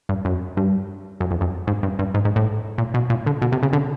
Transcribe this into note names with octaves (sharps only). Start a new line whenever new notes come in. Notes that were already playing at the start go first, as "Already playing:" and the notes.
G2
F#2
G2
F#2
F2
F#2
G#2
G2
G2
G#2
G#2
A2
A#2
B2
A#2
D3
B2
C3
C#3
D3